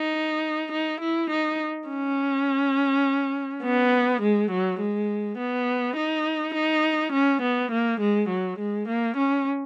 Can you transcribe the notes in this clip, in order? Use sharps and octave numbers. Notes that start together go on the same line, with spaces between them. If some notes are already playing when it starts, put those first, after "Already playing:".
Already playing: D#4
D#4
E4
D#4
C#4
B3
G#3
F#3
G#3
B3
D#4
D#4
C#4
B3
A#3
G#3
F#3
G#3
A#3
C#4